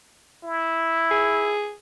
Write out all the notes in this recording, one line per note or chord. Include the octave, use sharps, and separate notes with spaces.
E4
G#4